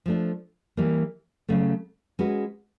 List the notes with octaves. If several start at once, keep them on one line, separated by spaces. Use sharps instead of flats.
F3 A3 D4
E3 G3 A#3
C#3 F#3 A3
G#3 C#4 F#4 B4